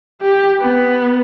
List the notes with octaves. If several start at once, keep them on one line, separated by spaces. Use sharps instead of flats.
G4
B3